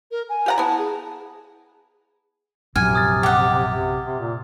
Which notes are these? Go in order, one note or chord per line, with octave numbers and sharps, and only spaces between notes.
A#4
G#5
G4 F#5 A#5
B3 E4 A5
G#4
A#1 F#2 C3 G#5 F6 G#6
D#6 F6 A6
G4 F#5
C3
C3
A#2